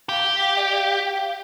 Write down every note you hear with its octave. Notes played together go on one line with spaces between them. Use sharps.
G4 F5
G5
F5
D5
F5
G5
F5